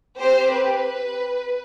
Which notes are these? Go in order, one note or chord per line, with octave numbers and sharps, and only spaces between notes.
C4 G4 C5
B4